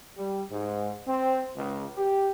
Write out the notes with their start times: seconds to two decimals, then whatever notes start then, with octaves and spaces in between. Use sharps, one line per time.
0.18 G3
0.52 G#2
1.08 C4
1.57 C#2
1.97 G4